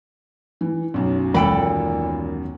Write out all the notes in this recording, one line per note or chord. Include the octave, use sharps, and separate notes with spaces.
E3
B1 F#2
D#2 A#2 E3 G#3 A4 G5 B5